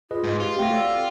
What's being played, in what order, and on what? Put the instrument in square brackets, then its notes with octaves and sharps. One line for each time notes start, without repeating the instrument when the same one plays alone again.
[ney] F4 [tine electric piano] G#4 B4 D#5
[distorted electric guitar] G#2
[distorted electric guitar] F4 [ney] G4
[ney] A3 [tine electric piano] C4 F5 A#6 [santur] F#4 G4
[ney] A4 [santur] D5